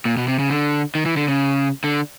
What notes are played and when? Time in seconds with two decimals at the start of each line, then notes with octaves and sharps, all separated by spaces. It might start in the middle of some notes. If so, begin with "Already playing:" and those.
0.05 A#2
0.17 B2
0.28 C3
0.39 C#3
0.50 D3
0.95 D#3
1.06 E3
1.17 D3
1.28 C#3
1.84 D3